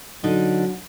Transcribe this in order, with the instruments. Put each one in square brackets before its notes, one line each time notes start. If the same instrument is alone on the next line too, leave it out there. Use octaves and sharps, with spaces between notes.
[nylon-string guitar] D3 D#4 [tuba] F#3